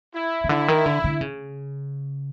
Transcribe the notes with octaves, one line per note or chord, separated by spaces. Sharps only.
E4
C#3
D3 E4
D#3
D3
D3
C#3